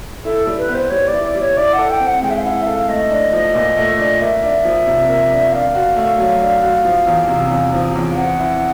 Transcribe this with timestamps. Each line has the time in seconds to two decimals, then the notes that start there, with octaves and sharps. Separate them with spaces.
0.25 E4 A4
0.47 G3
0.58 B4
0.69 B3
0.74 C5
0.90 G3 C#5
1.07 D5
1.13 E4
1.24 D5
1.35 G3
1.40 C#5
1.56 E4 D5
1.73 F#5
1.79 A4
1.90 G5
2.01 C4
2.06 F#5
2.23 G#3 G5
2.30 E5
2.37 F5
2.44 E4 F#5
2.62 E5
2.67 A4 F5
2.89 A3 D#5
3.11 D4
3.33 F3
3.55 A#2
3.77 A3
3.99 D4
4.21 A#3 E5
4.43 D4
4.65 F3
4.87 C3
5.09 A#3
5.31 D4
5.52 D4 F5
5.75 F#4
5.96 A3
6.19 F#3
6.41 D4
6.63 F#4
6.85 F3
7.07 E2
7.29 C3
7.51 E2
7.73 F3
7.95 E2
8.11 F5
8.17 C4 F#5
8.39 E4